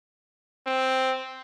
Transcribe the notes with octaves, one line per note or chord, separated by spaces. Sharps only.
C4